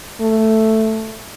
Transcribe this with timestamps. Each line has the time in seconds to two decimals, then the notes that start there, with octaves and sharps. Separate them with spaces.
0.20 A3